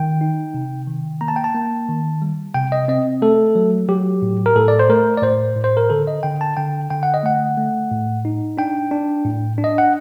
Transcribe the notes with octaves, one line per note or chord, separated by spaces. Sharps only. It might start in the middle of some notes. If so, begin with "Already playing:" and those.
Already playing: D#3 G5
D#4
C3
D#3
A#3 A#5
A5
G5
A5
A#3
D#3
G3
C3 G5
D#5
C4 D#5
A3 A4
F#3
F#3 G4
A2
A#4
A2 A4
D5
C5
A3 A#4
D5
A2 C5
A2
C5
A#4
D3 A4
D#5
D3 G5
A5
D3 G5
D3 G5
F#5
D#5
A3 F#5
A3
A2
D#4
D4 G5
D4
A2
D4
D#5
F#5